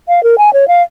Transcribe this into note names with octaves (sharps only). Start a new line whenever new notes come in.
F5
A#4
G#5
C#5
F5